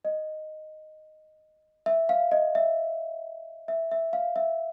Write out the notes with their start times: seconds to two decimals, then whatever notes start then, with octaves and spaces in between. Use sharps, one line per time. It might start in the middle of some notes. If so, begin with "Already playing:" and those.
0.05 D#5
1.86 E5
2.09 F5
2.32 D#5
2.55 E5
3.68 E5
3.91 E5
4.13 F5
4.36 E5